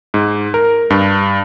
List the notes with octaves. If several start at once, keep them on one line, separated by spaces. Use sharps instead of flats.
G#2
A#4
G2